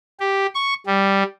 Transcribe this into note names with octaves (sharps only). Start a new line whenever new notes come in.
G4
C#6
G3